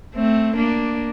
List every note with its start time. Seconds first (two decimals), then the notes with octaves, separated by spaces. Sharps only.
0.16 A3 C4
0.56 A#3 D4